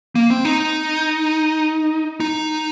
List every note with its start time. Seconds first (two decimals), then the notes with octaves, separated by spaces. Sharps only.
0.15 A#3
0.30 C4
0.45 D#4
2.20 D#4